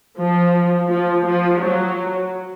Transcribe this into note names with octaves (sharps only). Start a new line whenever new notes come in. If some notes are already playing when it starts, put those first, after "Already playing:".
F3
F3
F3
F#3